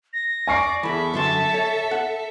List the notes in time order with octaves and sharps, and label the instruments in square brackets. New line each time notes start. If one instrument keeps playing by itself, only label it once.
[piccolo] A#6
[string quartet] D5 [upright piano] G#5 C#6 C7
[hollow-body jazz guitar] E2 E3 [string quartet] A4 E5 [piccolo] B5
[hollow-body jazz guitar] F#2 D3 C6 [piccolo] A5
[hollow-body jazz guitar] C#5
F#5